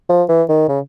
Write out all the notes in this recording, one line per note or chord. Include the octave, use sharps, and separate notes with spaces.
F3
E3
D#3
C#3